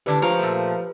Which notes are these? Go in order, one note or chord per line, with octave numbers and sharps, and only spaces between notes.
A2 D3 D4 G4 B4 D5
F3 F4 A#4 C#5
A#2 A3